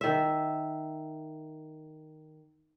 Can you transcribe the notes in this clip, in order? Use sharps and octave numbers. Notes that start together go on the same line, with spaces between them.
D#3 E5